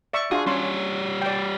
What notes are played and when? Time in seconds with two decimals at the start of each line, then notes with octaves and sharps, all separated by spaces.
0.13 D5 E5 C#6
0.31 D4 F4 F#4 G#4
0.46 G3 C#4 C#5 C6
1.22 D5 G5